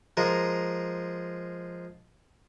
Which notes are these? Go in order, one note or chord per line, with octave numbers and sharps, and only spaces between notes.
F3 G#3 A#4